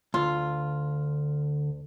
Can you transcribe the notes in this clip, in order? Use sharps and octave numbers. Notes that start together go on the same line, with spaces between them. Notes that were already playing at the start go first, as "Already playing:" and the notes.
D2 D3 F4